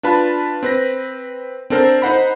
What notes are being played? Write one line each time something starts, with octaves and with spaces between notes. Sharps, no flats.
D4 F4 B4 A5 B5
C4 B4 A#6
C4 D4 A4 A#4 C5
D#4 C5 F#5 B5